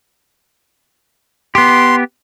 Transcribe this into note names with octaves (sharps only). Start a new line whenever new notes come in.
B3 G4 C6